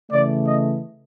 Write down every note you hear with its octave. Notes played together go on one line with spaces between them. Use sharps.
C#3 E3 A3 D5
D#5